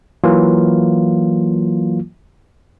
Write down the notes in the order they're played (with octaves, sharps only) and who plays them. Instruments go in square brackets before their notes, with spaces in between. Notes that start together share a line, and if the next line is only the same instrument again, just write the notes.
[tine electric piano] E3 F#3 A#3 F4